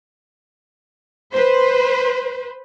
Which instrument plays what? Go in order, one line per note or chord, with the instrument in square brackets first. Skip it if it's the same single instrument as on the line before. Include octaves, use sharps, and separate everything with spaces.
[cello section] B4 C5